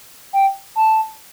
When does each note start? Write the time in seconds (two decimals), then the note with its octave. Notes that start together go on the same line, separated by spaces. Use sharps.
0.33 G5
0.76 A5